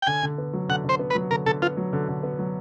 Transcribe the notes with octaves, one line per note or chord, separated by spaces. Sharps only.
G5
D3 G#5
D3
B3
F#3
D3 F#5
D3 C5
B3
B4
F#3
D3 A#4
D3 A4
B3 F4
F#3
D3
D3
B3
F#3